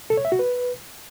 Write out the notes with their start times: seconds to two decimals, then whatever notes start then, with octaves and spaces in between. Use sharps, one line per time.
0.10 A4
0.17 C#5
0.25 E5
0.32 F#4
0.39 B4